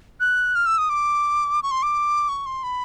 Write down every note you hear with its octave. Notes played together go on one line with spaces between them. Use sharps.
F#6
F6
E6
D#6
D6
C#6
C6
D6
C#6
C6
B5